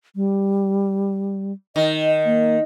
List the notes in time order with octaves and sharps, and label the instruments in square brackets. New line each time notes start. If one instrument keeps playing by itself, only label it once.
[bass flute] G3
[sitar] D#3 [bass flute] D#5
[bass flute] A#3